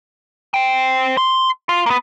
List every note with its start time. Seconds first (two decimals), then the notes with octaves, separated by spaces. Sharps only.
0.54 C5 G5
1.17 C6
1.69 F4
1.86 A#3 B3